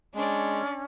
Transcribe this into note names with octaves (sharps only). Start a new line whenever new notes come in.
G#3 C#4 D4 D5